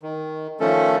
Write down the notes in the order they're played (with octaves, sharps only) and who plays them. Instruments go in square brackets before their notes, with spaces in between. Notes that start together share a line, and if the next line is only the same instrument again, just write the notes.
[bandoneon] D#3
D#3 F3 A3 C#4 A4